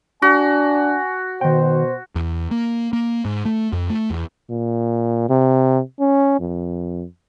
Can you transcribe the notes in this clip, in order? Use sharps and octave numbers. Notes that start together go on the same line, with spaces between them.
D4 F#4 G#5
B2 D#3 C5 G5
E2
A#3
A#3
G#2
A3
F2
A3
E2
A#2
C3
C#4
F2